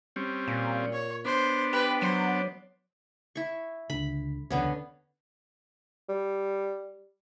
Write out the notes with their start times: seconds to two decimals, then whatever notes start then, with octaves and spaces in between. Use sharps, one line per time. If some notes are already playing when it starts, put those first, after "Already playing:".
0.16 G3 C4 C#4
0.48 A#2
0.93 C#5
1.25 B3 D4 C5
1.73 G4 B4
2.02 F#3 C5
3.36 E4 C#6
3.90 C#2 D3 B5
4.50 E1 C#2 D3 B3 C#4
6.09 G3